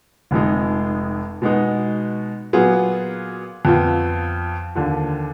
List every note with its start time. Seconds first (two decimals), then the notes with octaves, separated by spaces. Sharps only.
0.31 F1 F2 F3 G#3 D#4
1.42 B2 G#3 B3 D#4 F#4
2.53 A#2 F#3 B3 F4 G#4
3.65 F2 F3 B3 F4
4.75 D#2 D3 F3